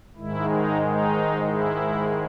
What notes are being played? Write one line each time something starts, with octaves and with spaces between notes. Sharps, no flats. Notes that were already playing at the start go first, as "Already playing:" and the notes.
G#2 D#3 G#3 E4
D#4
D#4
E4